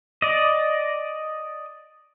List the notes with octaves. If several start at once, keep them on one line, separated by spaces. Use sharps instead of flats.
D5 D#5